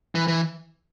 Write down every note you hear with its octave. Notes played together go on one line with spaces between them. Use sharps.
E3
E3